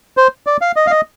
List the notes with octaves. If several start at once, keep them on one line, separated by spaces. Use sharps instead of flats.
C5
D5
F5
D#5
F5
D#5